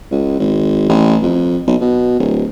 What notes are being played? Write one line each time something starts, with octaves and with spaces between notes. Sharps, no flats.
C#2
G#1
A1
F2
B1
B2
D1